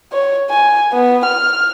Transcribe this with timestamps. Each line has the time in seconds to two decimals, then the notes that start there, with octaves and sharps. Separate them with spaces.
0.12 C#5
0.50 G#5
0.94 B3
1.26 F6